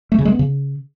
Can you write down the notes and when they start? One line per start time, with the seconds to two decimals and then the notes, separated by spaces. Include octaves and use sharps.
0.12 A3
0.18 C#3
0.25 G#3
0.32 B3
0.39 C#3